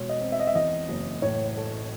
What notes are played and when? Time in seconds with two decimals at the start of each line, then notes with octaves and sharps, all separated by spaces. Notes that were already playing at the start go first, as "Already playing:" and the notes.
Already playing: E1 B2 C#5
0.09 D#5
0.21 C4
0.32 E5
0.40 D#5
0.47 E5
0.55 E2 D#5
0.88 F#1
1.22 A2 C#5
1.56 A3